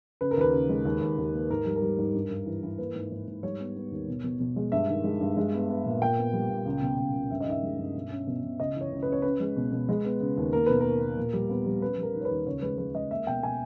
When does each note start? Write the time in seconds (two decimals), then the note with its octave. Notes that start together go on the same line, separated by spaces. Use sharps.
0.21 C#3 B4
0.31 A#4
0.37 D#2 B4
0.53 C#3
0.69 G#3
0.85 D#2
1.01 D#2
1.18 D#2
1.34 A#3
1.50 G#2 A#4
1.66 G3
1.76 A#4
1.82 G3
1.98 G#2
2.14 G2
2.31 G2
2.46 E3
2.63 E3
2.78 A#3 B4
2.95 G#2
3.12 G#2
3.28 G#2
3.43 G3 C#5
3.59 B3
3.76 B3
3.92 D#2
4.08 B2
4.24 B2
4.40 B2
4.56 G#3
4.72 G2 E5
4.89 D#3
5.04 G#3
5.21 G2
5.37 G#3
5.54 B3
5.69 B3
5.86 A#2
6.01 A#2 G5
6.18 B3
6.33 G3
6.50 A#2
6.66 C#2
6.82 B2
6.98 C#2
7.14 C#2
7.31 G2 E5
7.41 D#5
7.46 D#3 E5
7.63 G#3
7.79 G2
7.95 B2
8.10 C#4
8.27 B2
8.44 B2
8.60 C#2 D#5
8.75 E3
8.81 C#5
8.92 C#2
9.02 B4
9.08 C#3 C#5
9.22 C#4 B4
9.40 G#3
9.57 B2
9.72 B2
9.89 G#3
10.05 B3
10.20 C#3
10.37 D#2
10.53 A#3 A#4
10.67 B2 B4
10.81 A#3 A#4
11.01 A#3
11.17 A#2
11.33 G3
11.49 B3
11.66 G3
11.82 C#4 B4
11.98 G3 A#4
12.14 D#3
12.21 C#5
12.25 B4
12.31 D#2
12.46 C#2 C#5
12.62 G#3 B4
12.78 G#3 B4
12.94 G#3 D#5
13.11 A#3 E5
13.27 B2 G5
13.43 B2 G#5